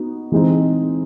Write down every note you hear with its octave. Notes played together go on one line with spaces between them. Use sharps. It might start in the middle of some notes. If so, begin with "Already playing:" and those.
Already playing: B3 D#4 F#4
E3 G#3 C4 D#4